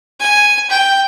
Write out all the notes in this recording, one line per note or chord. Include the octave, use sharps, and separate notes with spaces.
G#5
G5